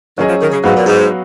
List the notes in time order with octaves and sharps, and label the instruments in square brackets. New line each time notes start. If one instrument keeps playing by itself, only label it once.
[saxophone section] D#3 [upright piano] F#3 C#4 G#4 D#5
[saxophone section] F3
D#3
C#3
[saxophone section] G#2 [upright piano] F#3 B3 F#4 B4 F5
[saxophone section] A#2
G#2